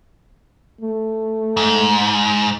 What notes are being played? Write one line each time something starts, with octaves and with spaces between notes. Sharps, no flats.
A3
G#2